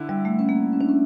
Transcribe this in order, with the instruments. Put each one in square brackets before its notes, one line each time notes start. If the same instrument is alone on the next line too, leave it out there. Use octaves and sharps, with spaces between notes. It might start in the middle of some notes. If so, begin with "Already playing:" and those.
Already playing: [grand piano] D3 E4
[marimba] G3
A3
C#4
A#3
C#4
D4
C#4